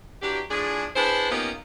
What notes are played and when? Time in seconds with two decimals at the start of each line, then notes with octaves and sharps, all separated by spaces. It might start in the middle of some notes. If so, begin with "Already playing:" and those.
0.22 E3 F#3 D4 G4
0.51 A2 F3 D4 G#4
0.96 D4 E4 G#4 B4 C5
1.31 A#3 B3 C#4 D#4 F4 G4